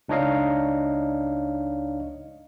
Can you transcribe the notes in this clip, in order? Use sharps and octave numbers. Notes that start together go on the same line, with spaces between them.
C#2 D4 D#4 C#5 D#5 F5